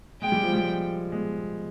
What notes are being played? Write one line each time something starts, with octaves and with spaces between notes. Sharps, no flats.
G#3 G5
G3
F3
G3
G#3